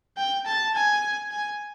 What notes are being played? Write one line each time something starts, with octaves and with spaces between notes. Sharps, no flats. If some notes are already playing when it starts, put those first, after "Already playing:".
G5
A5
G#5
G#5